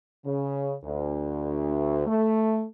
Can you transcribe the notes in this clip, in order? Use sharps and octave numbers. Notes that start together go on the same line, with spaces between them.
C#3
D2
A3